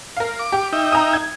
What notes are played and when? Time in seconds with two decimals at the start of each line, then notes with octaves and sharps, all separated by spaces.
0.17 A#4 F5
0.39 D6
0.52 G4
0.73 D#4 E5 G5
0.92 A#5 D#6
1.13 G#6